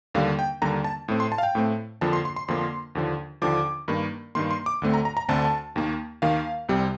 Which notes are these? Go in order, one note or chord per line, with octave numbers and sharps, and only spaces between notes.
D#2 D3 G3 A#3 F5
G5
D#2 D3 G3 A#3 A#5
A5
A2 A3 C4
C6
A5
F5
G5
A2 A3 C4
F2 D3 F3 A#3 A5
C6
C6
C6
F2 D3 F3 A#3 C6
D#2 D3 F3
D#2 D3 F3 D6
G2 D#3 A#3
G2 D#3 A#3 C6
C6
D6
D2 D3 A3 C4
A#5
A#5
A#5
D2 D3 A3 C4 A5
D#2 D#3 A#3
D#2 D#3 A#3 F5
C2 C3 G3 C4